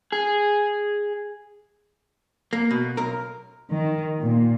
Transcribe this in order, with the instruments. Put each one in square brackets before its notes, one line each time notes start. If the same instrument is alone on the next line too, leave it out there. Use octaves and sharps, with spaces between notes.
[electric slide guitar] G#4
[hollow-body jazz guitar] A#3
B2
B1 A#4
[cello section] D#3
A#2